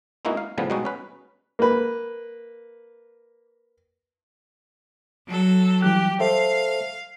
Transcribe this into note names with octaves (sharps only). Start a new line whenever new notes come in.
G#3 A#3 B3 D#4 E4 F#4
F5
A2 C#3 F3 G3 B3
B2 G3 G#3 D#4 F#4
C#4 B4
A#3 B4
F#3 A4
E3 G3 G4 F#6
A4 C5 E5 F5